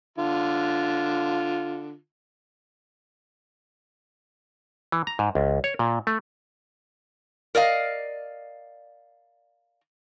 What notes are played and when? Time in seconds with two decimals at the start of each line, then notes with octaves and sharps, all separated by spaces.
0.18 D3 F4
4.92 E3
5.07 A#5
5.19 G#2
5.35 C#2
5.64 C#5
5.79 A#2
6.07 A3
7.55 A#4 D5 D#5 F5